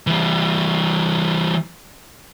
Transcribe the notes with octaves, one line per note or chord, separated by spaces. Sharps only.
E3 G3